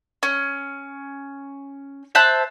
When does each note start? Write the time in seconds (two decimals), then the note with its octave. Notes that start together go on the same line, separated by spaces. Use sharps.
0.23 C#4
2.15 C5 E5 A5 F#6